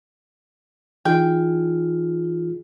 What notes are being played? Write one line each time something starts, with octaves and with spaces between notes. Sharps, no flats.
E3 D#4 F4 G#4 G5